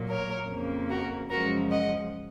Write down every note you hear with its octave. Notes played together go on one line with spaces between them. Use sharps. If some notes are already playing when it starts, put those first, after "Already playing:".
Already playing: A#2 F#3 A#3
A#4 C#5
F2 C#3 F3 A#3
F#4 A#4
F#2 C#3 F3 G#3 F#4 A#4
D#5 F#5